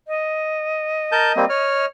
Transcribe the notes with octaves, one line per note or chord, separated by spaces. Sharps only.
D#5
A#4 A5 G6
G3 A#3 C4
C#5 F6